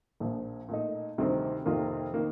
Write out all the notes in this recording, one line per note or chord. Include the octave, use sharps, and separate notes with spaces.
A#1 A#2 F3
A#2 A3 D#4
D2 C3 D#3 G3 C4
F2 C3 D#3 A#3 F4
D#3 A#3